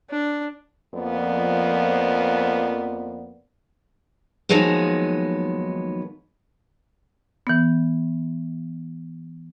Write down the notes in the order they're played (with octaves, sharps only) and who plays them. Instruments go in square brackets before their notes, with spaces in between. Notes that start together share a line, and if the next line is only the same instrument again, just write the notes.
[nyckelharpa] D4
[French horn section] F2 F3 A#3 B3 D5
[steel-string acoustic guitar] D#2 D#3 F3 F#3 G#3 B3
[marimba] E3 B3